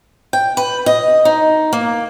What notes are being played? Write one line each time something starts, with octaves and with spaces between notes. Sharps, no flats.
G5
B4
D#5
D#4
A#3